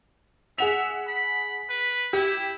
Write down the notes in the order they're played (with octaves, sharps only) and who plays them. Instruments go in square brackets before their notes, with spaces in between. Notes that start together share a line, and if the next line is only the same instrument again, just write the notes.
[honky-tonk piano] G#4 F#5 F7 [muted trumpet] E5
[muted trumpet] B5
B4
[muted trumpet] E4 [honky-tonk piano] G4